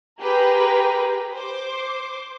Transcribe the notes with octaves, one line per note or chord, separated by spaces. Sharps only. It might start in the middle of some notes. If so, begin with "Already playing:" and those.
G4 G#4 A#4 B4 G5
C5 D6